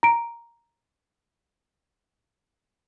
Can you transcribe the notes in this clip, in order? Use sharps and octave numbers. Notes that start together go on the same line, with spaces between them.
A#5 D7